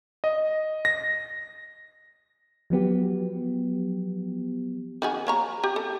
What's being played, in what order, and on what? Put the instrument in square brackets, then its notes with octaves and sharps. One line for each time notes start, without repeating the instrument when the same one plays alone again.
[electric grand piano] D#5
A#6
[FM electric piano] F3 F#3 B3 G4
[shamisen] D#3 F#4 G#4
A#3 C#5 A#5
G4
A4